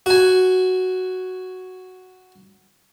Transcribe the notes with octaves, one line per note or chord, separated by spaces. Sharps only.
F#4 G#5